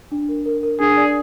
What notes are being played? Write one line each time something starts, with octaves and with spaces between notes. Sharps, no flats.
D4
A#4
A#4
A#4
D4 G#4
D5